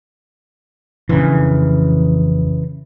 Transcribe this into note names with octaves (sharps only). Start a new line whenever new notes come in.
A1 F2 C#3 E3 D4